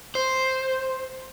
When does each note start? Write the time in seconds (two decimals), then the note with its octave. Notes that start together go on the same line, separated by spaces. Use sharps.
0.15 C5